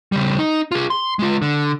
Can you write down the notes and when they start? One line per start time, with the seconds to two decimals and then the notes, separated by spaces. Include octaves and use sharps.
0.12 C#3 G3
0.39 D#4
0.71 F4 G#4
0.90 C6
1.19 G#3 F4
1.42 D3